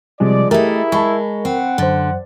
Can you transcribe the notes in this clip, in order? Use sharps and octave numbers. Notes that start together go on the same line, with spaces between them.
C3 F3 G3 G#3 D5
A3 D#4 E4 G4 G#4 A#4 E5
G#3 A5 B5 C#6
C4 F#5
F#2 D3 C5